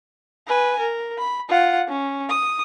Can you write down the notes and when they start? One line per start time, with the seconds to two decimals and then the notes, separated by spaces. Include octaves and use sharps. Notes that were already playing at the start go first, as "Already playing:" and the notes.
0.47 B4 G#5
0.79 A#4
1.18 B5
1.48 F4 F#5
1.88 C#4
2.29 D#6